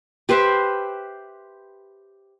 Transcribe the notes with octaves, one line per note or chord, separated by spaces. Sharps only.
G4 B4 C5 E5